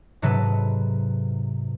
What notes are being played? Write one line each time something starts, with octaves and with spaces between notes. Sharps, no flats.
G#2 C3 F#3 A4 B4